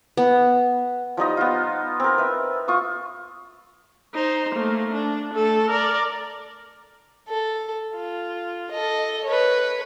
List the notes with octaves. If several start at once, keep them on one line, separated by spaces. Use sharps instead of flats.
B3
F3 G3 D#4 D#5
B3 F4
C4 A#4
B4 E5
F4 C#6 D#6
D#4 C5
A3 A#3
D4
A3 A4
A#4 D5
A4
F4
A4 D#5
B4 C#5